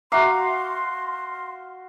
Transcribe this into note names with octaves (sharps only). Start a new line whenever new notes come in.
F#4 E5 F5 A#5 C6 D6